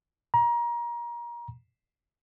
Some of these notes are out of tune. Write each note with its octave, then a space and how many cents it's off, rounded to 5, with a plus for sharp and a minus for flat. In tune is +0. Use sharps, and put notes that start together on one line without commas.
A#5 +30